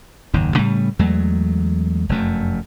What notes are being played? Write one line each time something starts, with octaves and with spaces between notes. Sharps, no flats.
F#1 D#2 G#2
A2 C#3 G3 A3
E2 F#3 G#3 A3
F1 F#2 A3